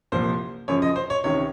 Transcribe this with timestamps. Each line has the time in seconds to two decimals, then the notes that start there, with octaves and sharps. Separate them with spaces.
0.12 C2 A#2 F3 C5
0.68 F#2 C#3 F3 C#5
0.82 D#5
0.96 C5
1.10 C#5
1.24 C#2 C3 D#3 C#5